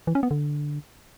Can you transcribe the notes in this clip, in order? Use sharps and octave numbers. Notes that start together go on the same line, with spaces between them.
E3
C#4
B3
D3